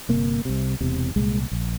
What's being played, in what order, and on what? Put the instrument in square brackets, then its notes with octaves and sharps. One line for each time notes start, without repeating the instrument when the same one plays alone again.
[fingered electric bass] F2 C3 A#3
G1
C2 C3
E1 E2 C3
C2 A#2 G#3
A#1